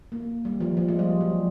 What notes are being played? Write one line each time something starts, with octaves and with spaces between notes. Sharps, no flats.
A#3
G3
F3
F3
G#3
G3
F#3